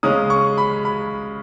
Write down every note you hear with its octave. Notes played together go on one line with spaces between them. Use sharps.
C#3 G#3 C#4 D#6
C#6
B5
B5